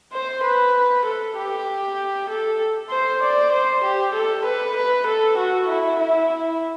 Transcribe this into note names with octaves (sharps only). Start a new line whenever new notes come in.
C5
B4
A4
G4
A4
C5
D5
C5
G4
A4
B4
B4
A4
F#4
E4
E4